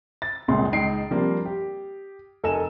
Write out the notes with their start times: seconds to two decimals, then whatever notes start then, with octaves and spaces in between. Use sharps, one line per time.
0.22 A6
0.48 G1 C#2 A#2 G#4 C6
0.73 C#2 D#4 G5 C7 D7
1.11 F3 G3 A#3 C4 D4
1.45 G4
2.44 F1 A4 A#4 G#5 E7